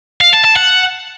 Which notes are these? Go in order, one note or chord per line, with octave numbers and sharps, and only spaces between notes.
F5
A5
A5
F#5